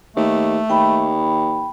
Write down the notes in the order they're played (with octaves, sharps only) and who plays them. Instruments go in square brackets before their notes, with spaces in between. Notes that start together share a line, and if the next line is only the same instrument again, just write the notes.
[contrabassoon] D#2 [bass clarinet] A3
[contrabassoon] D#2 [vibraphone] G5 B5